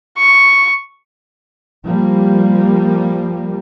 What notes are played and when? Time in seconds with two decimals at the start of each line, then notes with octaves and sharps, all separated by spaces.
0.18 C#6
1.86 F3 G3 A#3